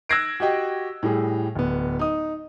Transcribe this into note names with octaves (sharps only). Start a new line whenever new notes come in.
E6 F#6 G#6 A#6 C7 D7
F#4 G4 D#5 G5
A2 G3 G#4
D1 B3
D#4 D#6